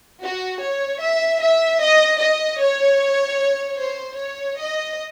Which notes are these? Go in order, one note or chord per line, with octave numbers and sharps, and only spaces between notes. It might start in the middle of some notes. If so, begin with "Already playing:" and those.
F#4
C#5
E5
E5
D#5
D#5
C#5
C5
C#5
D#5